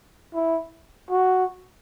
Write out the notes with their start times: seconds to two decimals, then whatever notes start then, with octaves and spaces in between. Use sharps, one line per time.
0.34 E4
1.11 F#4